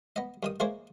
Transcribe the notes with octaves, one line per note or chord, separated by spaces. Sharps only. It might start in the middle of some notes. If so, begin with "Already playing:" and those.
B3 D#5
G2 D#3 D#6
E3 G#3 A#3 C5 C#5